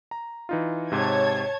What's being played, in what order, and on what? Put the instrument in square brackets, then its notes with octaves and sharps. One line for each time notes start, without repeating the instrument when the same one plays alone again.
[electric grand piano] A#5
E3 D#4 F4
[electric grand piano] G#2 C3 [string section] C#5 A5 G#6